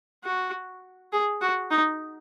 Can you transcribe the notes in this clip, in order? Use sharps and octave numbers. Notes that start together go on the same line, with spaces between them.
F#4
G#4
F#4
D#4